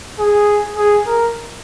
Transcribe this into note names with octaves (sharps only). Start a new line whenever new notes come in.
G#4
G#4
A#4